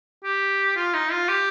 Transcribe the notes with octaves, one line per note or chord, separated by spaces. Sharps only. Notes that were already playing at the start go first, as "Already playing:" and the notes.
G4
F4
D#4
F4
G4